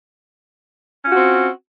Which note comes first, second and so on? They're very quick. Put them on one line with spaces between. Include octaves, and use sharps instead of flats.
C#4 F4 F#4 C4